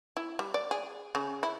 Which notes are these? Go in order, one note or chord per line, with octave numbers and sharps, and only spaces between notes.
E4
G3
D5
G#4
C#3
E4